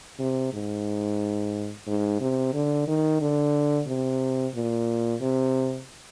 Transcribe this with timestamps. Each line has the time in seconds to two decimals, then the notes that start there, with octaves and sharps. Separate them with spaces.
0.20 C3
0.53 G#2
1.87 G#2
2.21 C3
2.54 D3
2.87 D#3
3.21 D3
3.87 C3
4.55 A#2
5.21 C3